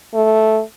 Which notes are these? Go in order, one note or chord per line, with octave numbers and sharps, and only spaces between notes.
A3